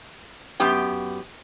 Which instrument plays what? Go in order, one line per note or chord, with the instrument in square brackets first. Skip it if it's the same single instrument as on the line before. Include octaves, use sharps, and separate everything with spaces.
[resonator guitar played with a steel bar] F#2 B3 G4 G5